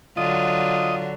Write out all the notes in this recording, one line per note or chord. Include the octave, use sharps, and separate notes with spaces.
D3 F#3 F4 D#5